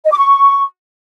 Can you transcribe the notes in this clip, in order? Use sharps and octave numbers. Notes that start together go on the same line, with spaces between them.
D#5
D6
C#6